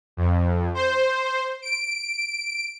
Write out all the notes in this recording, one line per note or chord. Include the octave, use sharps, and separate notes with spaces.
F2
C5
D7